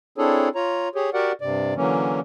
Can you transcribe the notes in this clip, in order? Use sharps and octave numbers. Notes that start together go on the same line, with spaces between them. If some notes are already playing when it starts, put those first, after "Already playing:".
C4 D4 E4 G#4 A4 C#5
F4 C#5 A#5
G4 G#4 C#5
F#4 G4 A#4 D5 F#5
G2 C3 D5
D3 E3 F#3 A#3 C#4